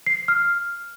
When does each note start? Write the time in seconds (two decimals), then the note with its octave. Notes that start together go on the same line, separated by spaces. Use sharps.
0.07 C7
0.28 F6